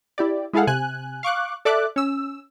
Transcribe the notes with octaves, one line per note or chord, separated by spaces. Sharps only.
E4 G4 D5
G#3 E4 G#4 A4 F5 F#5
C3 G#5 F#6
F5 C#6 D6 F#6
A4 D5 E5 D6 F#6
C#4 E6